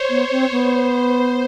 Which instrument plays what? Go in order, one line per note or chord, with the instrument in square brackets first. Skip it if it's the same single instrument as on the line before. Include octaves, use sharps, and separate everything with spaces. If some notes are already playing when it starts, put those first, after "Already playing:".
Already playing: [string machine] C5 C#5
[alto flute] B3
C4
[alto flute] B3 [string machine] C5